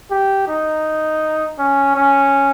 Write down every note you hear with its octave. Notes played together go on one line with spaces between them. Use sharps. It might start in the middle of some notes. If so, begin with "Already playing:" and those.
G4
D#4
C#4
C#4